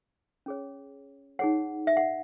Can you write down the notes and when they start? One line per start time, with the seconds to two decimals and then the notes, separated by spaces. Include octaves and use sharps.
0.46 C#4 G#4 C#5
1.39 D#4 G#4 C#5 F#5
1.87 E5
1.97 F#5